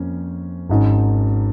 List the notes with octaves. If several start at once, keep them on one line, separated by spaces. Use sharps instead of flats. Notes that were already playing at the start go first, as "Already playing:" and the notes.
Already playing: F2 F3 A#3 C#4
G#1 G#2 D#3 C#4